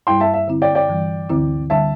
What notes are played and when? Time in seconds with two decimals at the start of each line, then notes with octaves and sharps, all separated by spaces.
0.07 G2 G3 E4 G5 C6
0.20 E5 A5
0.34 E5
0.48 D3 C4 E4
0.62 D5 G5
0.75 D5 G5
0.88 G2 E3 G3
1.30 D2 D3 C4 E4
1.70 D3 G3 D4 E5 A5